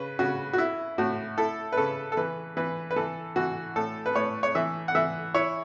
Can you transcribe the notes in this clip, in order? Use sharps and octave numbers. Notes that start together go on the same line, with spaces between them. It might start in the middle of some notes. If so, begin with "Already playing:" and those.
Already playing: C#3 B4
C#3 F#4
F#4
E4
A2 F#4
E4 A4
B4
C#3 A4
A4
E3 B4
E3 B4
B4
E3 A4
E3 F#4
A2 A4
B4
A2 C#5
C#5
E3 E5
F#5
E3 E5
E4 C#5